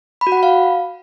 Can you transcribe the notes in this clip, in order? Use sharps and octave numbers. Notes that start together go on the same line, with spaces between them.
B5
F#4
F#5
B5
F5